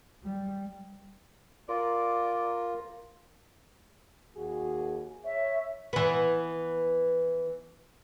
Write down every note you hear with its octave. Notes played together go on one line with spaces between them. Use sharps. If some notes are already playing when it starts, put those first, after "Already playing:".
G3
F4 A#4 D5
D#2 F#4 G#4
C#5 E5
E3 B3